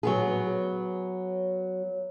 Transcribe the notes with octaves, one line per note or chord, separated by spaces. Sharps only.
F#3 B3 G#4